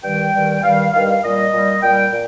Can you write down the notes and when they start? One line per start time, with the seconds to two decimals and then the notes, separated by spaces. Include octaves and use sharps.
0.03 G2 D#3 G3 G5
0.33 G2 D#3 G3
0.64 G2 D#3 G3 F5
0.92 G2 D#3 G3 F5
1.08 F5
1.23 A#2 G3 D#5
1.53 A#2 G3
1.82 A#2 G3 G5
2.12 A#2